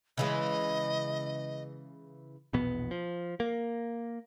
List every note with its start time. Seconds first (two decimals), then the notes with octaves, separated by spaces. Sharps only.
0.18 C#3 E3 G#3 D#5
2.53 A#1 E2 B2 B3
2.91 F3
3.40 A#3